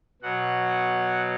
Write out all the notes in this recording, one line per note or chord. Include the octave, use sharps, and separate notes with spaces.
B2 F#3 F#5